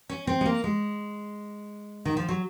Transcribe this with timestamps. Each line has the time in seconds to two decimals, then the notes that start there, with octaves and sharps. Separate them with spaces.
0.09 C#4
0.27 C4
0.41 G#3
0.46 A#3
0.64 G#3
2.05 D#3
2.17 F3
2.29 F#3